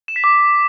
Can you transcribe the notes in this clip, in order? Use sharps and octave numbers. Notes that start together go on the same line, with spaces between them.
E7
B6
D6